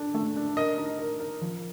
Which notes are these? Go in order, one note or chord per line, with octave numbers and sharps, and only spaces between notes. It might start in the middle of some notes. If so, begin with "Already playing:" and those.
Already playing: D4 A4
A3
D4
A#4 D#5
D#4
A#4
A#4
F3